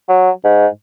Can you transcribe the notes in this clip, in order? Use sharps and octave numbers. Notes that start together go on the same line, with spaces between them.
F#3
G#2